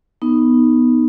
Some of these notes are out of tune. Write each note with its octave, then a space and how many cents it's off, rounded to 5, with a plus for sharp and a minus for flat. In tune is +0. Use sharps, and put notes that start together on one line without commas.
B3 +0 D#4 +0